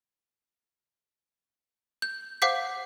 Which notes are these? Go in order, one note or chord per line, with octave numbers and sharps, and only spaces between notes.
G6
C5 F5 F#5 D6 G6 B6